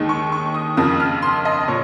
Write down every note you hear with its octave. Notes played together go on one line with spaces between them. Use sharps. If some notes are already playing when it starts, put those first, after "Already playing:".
Already playing: D#2 D#3 G#3
C#6
C#6
D#6
F2 C#3 F3 A#3 D#6
F6
C6
D#5
A#2 C#5